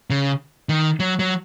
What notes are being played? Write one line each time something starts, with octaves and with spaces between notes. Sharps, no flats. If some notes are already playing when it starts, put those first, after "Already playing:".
C#3
D#3
F#3
F#3